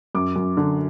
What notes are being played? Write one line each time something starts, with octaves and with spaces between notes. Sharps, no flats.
F#2 D6
F#2
D3